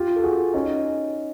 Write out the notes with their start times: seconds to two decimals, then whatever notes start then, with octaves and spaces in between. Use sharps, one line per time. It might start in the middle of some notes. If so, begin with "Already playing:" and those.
Already playing: F4 G4
0.16 A4
0.23 F#4 G#4
0.54 C#4 D#4